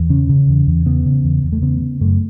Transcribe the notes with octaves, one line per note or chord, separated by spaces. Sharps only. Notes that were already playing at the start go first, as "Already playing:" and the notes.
Already playing: E2
C#3 C#4
C#3
E2
E2
C#3 B3
C#3
E2
E2
A3
C#3 B3
C#3
F#2 A3